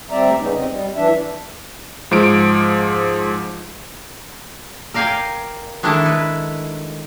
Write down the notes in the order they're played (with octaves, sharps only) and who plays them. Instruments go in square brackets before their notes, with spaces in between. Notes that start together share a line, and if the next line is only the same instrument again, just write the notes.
[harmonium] D2 G3 C4 D5 E5 A#5
C#3 B3 C#4 D#4
F2 C4 D#5
G3
E3 D4 E5
[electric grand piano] G#2 F3 D7
[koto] A#4 D5 F5 G5 G#5
D#3 G#3 D4 E4 A4
B4